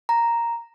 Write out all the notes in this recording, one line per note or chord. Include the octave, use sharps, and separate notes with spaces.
A#5